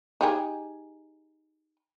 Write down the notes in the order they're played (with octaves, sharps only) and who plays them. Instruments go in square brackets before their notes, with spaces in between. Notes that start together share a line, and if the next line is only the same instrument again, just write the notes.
[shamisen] D#4 G4 G#4